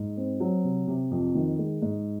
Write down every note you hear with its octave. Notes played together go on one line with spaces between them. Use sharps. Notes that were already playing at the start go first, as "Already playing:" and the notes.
Already playing: G#2
C4
F#3
C3
C3
F2
D#3
G#3
G#2